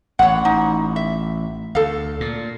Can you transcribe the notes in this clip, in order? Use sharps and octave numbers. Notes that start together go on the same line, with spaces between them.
A1 C#5 F#5
D#4
E5
D2 A4 F5
A#2